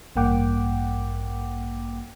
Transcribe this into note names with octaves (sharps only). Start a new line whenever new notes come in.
A1 G2 A#3 F#5 G5 D6